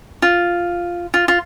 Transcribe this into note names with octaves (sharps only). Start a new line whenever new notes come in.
F4
F4
F4